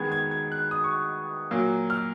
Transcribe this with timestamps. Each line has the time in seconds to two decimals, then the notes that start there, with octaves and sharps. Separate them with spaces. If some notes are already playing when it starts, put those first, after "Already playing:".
Already playing: D#3 G#3 B3 G#6
0.12 G#6
0.31 G#6
0.52 F#6
0.71 D#6
0.84 C#6
1.51 A#2 F#3 A#3
1.90 F6